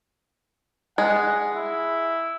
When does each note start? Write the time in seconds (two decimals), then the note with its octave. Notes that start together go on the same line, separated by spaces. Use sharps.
0.98 G#3 F#5
1.55 E4